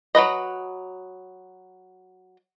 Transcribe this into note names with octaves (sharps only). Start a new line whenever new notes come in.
F#3 A#3 B4 D#5